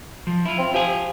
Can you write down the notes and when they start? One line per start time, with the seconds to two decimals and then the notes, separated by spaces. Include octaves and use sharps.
0.27 F3
0.45 E4 F4
0.59 C4
0.74 F3 G4 G#5